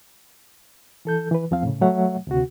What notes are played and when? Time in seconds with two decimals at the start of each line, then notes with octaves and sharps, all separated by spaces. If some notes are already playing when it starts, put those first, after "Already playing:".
1.05 E3 A4 G6
1.31 E3 B4
1.51 E2 F3 C4 F5
1.63 A2 C#3
1.81 F#3 A3 C#5 E5 F#5
2.27 D2 C3 F#4